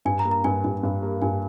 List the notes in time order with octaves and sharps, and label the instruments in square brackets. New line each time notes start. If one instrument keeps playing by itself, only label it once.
[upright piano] G2 [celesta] G#5
[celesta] A#5
[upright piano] A#3
[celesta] A#5
[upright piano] G2 [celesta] G#5
[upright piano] G2
G2
A#3
[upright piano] G2 [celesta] G#5